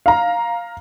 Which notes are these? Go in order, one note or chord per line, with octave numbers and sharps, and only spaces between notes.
F5 A#5